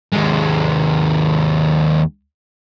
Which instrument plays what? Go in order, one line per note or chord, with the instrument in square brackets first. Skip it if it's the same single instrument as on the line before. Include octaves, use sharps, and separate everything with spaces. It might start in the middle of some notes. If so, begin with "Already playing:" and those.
[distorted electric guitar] D#2 G#3